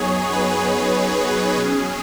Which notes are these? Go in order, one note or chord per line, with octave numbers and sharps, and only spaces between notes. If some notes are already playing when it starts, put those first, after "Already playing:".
Already playing: F#2 F#3 B3 D#4 G#4 C#5
B4
B2 F#3 C#4 G#4